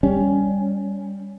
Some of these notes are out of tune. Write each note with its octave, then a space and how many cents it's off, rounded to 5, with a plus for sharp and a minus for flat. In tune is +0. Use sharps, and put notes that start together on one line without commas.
G3 +15 C#4 +15